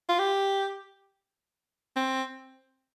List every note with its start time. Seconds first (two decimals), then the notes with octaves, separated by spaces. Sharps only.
0.09 F4
0.19 G4
1.96 C4